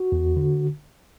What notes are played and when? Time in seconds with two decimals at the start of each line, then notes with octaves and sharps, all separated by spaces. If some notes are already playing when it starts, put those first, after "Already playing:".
Already playing: F#4
0.12 E2
0.37 D3